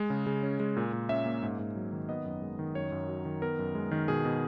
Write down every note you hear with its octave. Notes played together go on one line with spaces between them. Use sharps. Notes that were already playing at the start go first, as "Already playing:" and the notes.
Already playing: G#3
C#3
C#3
C#4
G#3
A#2
A#2
C#4 E5
A#3
G#2
G#2
F#3
D#3
B3 D#5
F#2
G#3
D#3
F#2 C#5
F#2
F#3
D#3
B3 A#4
F#2
G#3
D#3
B2 G#4
B2